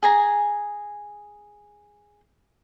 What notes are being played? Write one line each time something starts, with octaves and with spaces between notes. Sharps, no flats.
G#4 G#5 A#5